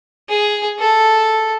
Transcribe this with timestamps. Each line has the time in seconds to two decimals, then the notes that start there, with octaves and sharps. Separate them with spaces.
0.29 G#4
0.79 A4